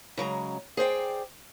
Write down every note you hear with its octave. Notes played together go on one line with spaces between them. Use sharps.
C#3 F#3 G#3 A#5
G#4 C5 D5 G5